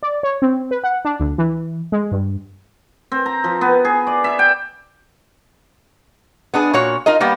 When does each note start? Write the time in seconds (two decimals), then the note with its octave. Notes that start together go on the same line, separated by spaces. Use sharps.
0.03 D5
0.23 C#5
0.42 C4
0.71 B4
0.84 F#5
1.05 D4
1.20 D2
1.38 E3
1.92 G#3
2.12 G2
3.12 C4
3.26 A#5
3.44 F3
3.61 B3
3.85 G#4
4.07 D5
4.24 E5
4.39 G5
6.54 B3 D4 G#4
6.74 A#2 F#4 C#5
7.06 D#4 F4 A#4 D#5
7.20 G3 A#3 B3